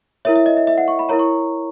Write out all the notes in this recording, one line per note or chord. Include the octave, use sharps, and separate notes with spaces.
E4 A#4 C#5 E5
E5
D#5
E5
E5
F#5
C#6
B5
E4 A#4 C#5 A#5
C#6